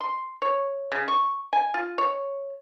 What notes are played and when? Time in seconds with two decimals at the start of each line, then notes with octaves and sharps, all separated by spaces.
0.01 C6
0.42 C#5
0.92 C#3
1.08 C#6
1.53 G#5
1.74 F4
1.98 C#5